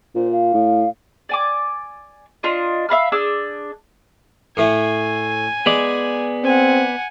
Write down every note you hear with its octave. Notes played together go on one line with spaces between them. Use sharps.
A#2 C5
F5
A2
D5 G#5 D6
D4 F4 D#5
E5 F5 B5 F6
D4 G#4 D6 E6
A2 A3 G#5
G#3 B3 D5
C4 F#5 G#5